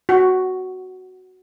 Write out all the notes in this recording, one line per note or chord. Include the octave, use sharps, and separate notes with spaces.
F#4